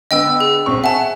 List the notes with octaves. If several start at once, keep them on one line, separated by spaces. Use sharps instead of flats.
D3 B3 D#5 G5 E6
G#4
B1 C4 C#6
E5 F#5 G#5 A5